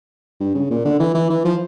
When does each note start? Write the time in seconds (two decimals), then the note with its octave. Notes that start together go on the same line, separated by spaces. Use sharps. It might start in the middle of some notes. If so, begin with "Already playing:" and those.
0.40 G2
0.55 C#3
0.70 A#2
0.85 D3
1.00 E3
1.15 E3
1.30 E3
1.45 F3